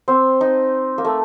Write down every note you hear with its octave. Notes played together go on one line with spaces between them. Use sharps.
C4
D#4
A#3
A3